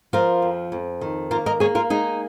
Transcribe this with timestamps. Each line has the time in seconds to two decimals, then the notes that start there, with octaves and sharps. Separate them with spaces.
0.13 F3 F4 A#4
0.42 F2
0.72 F2
1.01 D#3
1.31 A#3 F4 A#4
1.46 A#4 D#5
1.60 A#3 G#4 C#5
1.75 F4 A#4
1.90 G#3 D#4 G#4